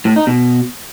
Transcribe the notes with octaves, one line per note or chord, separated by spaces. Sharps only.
A2
D#4
B2